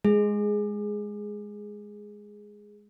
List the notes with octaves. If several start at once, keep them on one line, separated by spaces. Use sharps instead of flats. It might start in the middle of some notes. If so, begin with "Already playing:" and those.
G#3 G#4